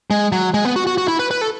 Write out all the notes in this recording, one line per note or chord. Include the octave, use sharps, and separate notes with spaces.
G#3
F#3
G#3
B3
F#4
F#4
F#4
E4
B4
B4
A4